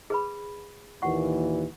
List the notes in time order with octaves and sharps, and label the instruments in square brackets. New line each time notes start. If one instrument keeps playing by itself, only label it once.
[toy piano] G#4 B4 B5
[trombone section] D#2 A#2 E3 [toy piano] F#5 C#6